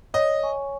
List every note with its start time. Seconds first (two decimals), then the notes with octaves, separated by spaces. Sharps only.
0.14 C#5 D#5
0.43 G#5 C#6